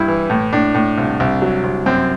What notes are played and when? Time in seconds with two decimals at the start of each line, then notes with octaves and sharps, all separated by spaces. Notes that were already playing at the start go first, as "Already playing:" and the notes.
Already playing: G2 E4
0.08 E3
0.30 A2
0.53 A2 D4
0.74 A2
0.98 C2
1.20 C2
1.42 F#3
1.64 C2
1.86 F#2 C4